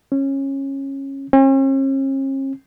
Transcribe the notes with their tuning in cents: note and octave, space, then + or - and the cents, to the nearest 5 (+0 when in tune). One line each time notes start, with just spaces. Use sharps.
C#4 -20
C#4 -45